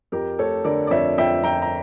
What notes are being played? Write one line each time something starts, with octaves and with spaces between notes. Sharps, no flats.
F2 G4 A#4
A3 A4 C#5
D3 A#4 D5
D5
F2 C#5 E5
F2 E5 G5
F2 G5 A#5
A#5